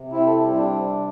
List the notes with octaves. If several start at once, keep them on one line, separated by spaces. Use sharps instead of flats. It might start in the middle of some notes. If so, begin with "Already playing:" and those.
Already playing: C3
C4 E4
A4
G4
G3 E4
D4
C3